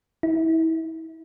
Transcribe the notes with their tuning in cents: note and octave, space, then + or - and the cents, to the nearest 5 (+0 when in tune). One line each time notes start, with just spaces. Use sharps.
E4 -35